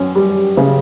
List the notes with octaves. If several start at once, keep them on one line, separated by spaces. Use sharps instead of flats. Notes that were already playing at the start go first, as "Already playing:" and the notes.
Already playing: F#2 C#4
G3
C#3